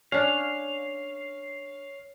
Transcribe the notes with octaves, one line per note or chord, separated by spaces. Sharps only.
C#4 D4 C#5 F5